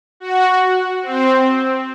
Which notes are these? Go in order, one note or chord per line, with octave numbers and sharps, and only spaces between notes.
F#4
C4